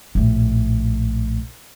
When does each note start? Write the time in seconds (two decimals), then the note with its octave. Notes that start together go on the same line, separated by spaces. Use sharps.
0.15 A#1 A2